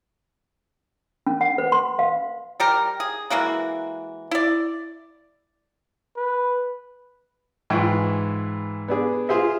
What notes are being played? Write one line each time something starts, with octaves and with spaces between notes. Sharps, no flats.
C#4
F#5
B4
C6
F5
G3 G4 A#4
G#4
E3 G#3 A#3 F#4
E4 D5
B4
G#2 E3 F4 B4 G5 C#6
B3 D4 G#4
F4 G#4 C5 E5